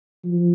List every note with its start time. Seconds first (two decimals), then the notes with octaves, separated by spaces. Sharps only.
0.24 F3